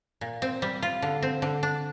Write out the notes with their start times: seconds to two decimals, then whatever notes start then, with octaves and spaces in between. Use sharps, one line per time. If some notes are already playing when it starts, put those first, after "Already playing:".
0.21 A#2
0.42 C4
0.62 G3
0.82 F4
1.02 D3
1.23 C4
1.42 D3
1.63 D4